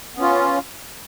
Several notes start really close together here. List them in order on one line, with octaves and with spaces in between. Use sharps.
B3 C#4 F4